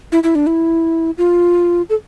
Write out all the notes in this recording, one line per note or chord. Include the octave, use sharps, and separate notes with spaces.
E4
E4
D4
E4
F4
A4